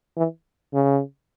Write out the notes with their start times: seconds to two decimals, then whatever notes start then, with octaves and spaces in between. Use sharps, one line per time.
0.17 E3
0.74 C#3